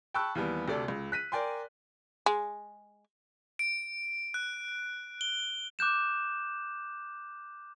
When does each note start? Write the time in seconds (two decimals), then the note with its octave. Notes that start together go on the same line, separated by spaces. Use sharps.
0.14 G5 A5 B5 C#6 E6 F#6
0.35 D#2 E3 G3 B3
0.68 D2 C3 A4 D5
0.88 C#2
1.12 F#6 B6 D#7
1.32 A#4 D5 G5 G#5 C6
2.26 G#3
3.59 D7
4.34 F#6
5.21 G7
5.79 D6 F#6 G6 E7